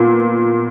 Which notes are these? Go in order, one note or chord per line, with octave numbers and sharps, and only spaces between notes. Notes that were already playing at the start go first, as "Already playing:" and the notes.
Already playing: A#2 B3